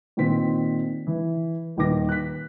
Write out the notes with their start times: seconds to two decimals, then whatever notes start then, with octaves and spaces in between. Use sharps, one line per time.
0.17 A#2 D#3 C4 B6
1.07 E3
1.77 D#1 D#3 B4 D6 A#6
2.09 F#6 B6